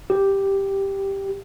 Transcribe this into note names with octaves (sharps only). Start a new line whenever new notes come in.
G4